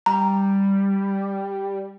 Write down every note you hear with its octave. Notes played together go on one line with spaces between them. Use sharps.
G3 A#5